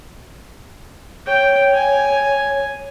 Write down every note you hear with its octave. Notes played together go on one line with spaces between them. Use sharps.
C#5 G5
G#5